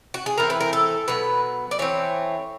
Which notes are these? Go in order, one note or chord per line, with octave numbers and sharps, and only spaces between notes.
F#4
G#4
A2 E3 A3 C4 A#4
B4
A#4
A4
B2 F#3 B3 B4
D5
E3 A3 C4 C#5